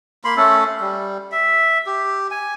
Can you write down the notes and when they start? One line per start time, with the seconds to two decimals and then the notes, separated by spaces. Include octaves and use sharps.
0.24 A#3 B5 C6
0.37 A3 C#4 A4
0.80 G3
1.32 E5
1.86 G4
2.31 G#5